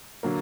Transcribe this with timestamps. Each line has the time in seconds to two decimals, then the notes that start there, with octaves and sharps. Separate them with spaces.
0.23 D3 F#3 A#3